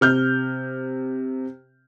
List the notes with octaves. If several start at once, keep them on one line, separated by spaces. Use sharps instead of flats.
C3 F6 G6